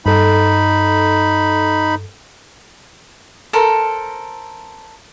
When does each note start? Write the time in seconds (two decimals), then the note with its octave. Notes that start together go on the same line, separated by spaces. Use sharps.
0.06 G2 D#4 A4 B5
3.53 A4 A#4 C5